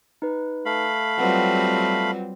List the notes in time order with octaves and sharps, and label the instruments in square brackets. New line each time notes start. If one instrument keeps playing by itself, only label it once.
[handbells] D#4 B4
[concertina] A3 F5 B5
[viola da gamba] F#3 G3 C4 [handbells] F4 B4 F#5